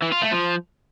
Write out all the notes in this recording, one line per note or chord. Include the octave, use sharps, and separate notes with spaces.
E3
F4
A3
F3